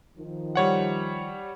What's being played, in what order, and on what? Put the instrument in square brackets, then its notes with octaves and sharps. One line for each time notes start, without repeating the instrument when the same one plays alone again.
[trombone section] D#3 F3
[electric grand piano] G3 C#5 F#5